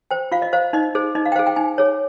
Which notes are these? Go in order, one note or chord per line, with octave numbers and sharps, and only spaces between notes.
C5 G5
F4 F5
D#5
C5 F5
D#4 D#5
G#4 C5
D#4 D#5
F5
G5
G#4 C5 F5
G5
D#4 G#5
G#4 C#5